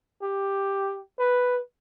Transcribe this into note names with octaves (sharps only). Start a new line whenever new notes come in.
G4
B4